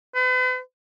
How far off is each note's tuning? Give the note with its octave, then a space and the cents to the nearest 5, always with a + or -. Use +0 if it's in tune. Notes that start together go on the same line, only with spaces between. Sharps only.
B4 +45